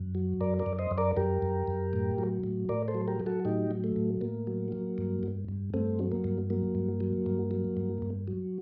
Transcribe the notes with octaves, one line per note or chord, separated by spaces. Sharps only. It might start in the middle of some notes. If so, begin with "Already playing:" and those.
Already playing: F#2
F#3
F#2 A#4 D5
A#4 D5
F#2
C5 D#5
F#2
A#4 D5
F#2 G4 A#4
F#2
F#2
A2
F#3
A2
A2 A#4 D5
A4 C5
F#3
G4 A#4
F#3
F#4 A4
A2 D#4 G4
F#3
A3
A2
A2 A#3
F#3
F#3
G2
G2
G2
G2 A3 C4
F#3
A#3
G2
F#3 A#3
G2
F#3
G2
F#3
G2
G2
F#3